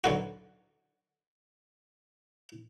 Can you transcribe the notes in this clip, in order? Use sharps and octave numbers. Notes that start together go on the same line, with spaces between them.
B1 D3 F#4